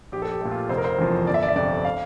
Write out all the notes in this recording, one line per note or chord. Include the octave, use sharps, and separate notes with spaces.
A#1 G4
A4
G4
A#2 A3
F4
F1 C5
A#4
C5
E2 C3 F3
G1 D5
E5
D5
E5
F2 C3 D5
F5